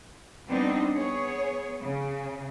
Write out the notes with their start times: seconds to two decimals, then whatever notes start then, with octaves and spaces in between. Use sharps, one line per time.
0.48 G3 B3 C4 D4 D#4
0.94 B3 G#4 C#5
1.81 C#3